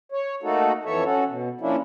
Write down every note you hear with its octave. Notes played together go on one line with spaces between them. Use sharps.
C#5
A3 A#3 D#4 F#4 A4
F2 E3 A4 C#5 E5
C#4 F#4 A4
B2
F3 A#3 C#4 D4 E4